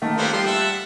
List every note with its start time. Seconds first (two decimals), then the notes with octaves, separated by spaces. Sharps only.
0.02 D#3 A3 A#3
0.18 G3 B3 C4 A4 F5
0.33 F3 G3 C6
0.46 E5 F#5 A5